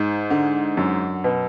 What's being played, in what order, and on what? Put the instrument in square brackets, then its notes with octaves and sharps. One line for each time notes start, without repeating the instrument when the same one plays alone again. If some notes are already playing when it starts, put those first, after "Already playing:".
Already playing: [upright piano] G#2
D3
F#2
B2